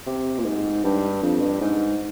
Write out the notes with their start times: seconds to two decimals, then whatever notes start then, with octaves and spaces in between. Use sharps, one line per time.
0.07 C3
0.38 A#2
0.45 G#2
0.84 G2
1.22 F2
1.41 G2
1.60 G#2